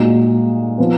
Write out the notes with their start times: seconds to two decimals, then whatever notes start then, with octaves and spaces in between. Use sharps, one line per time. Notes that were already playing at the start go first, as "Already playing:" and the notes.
Already playing: A#2 G#3 D#4 F#4
0.78 F3 B3